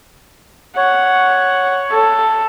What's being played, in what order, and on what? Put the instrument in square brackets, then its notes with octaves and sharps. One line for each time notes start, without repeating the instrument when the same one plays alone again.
[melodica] C#5 [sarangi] F#5
[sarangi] A4